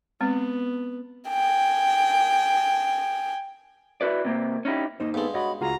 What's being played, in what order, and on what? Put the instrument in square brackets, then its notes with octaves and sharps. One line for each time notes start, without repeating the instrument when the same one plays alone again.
[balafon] G#3 C4 [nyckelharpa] B3
[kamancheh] G5 G#5
[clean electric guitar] E4 F#4 B4 D5
C3 A#3 C4
C#4 D#4 E4 G4
[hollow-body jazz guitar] A#3 D#4 C5 [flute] D#5
[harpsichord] G2 G#3 [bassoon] B3 [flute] A4
[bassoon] F#4 [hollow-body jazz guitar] C#5 D#5 [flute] B5
[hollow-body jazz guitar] C#2 F4 G#4 [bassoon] F#4 [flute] A#5